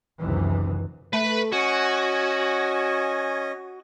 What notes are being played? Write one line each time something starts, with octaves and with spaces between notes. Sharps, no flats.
F#1 C#2 F#2 C3 D#3 E3
A3 B4 B5
C#4 F#4 D#5 G#5